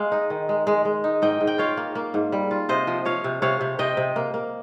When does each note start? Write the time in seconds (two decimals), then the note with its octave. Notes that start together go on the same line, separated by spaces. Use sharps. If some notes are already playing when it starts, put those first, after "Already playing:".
Already playing: G#3 F5
0.12 D#4
0.30 D#3
0.49 G#3
0.67 G#3
0.85 G#3
1.04 D#4
1.22 G#2 D#5 G5
1.41 G#2
1.47 G5
1.58 F4 C#5 F5
1.77 A#3
1.95 A#3
2.14 G#2
2.32 G3
2.51 F4
2.69 C3 C5 D#5
2.87 F3
3.05 F3 C#5 F5
3.24 C3
3.42 C3 C#5 F5
3.61 C3
3.79 C3 D#5 G5
3.97 C3
4.16 A#3
4.34 A#3